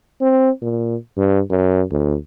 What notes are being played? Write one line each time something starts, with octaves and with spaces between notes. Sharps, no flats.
C4
A#2
G2
F#2
D2